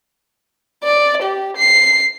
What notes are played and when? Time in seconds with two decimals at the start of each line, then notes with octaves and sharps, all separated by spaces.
0.84 D5
1.22 G4
1.56 C7